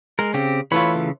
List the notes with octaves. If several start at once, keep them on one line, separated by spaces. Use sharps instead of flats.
G#3 A#4
C#3 C4 G4
E3 A3 F4 C#5 B5
C#3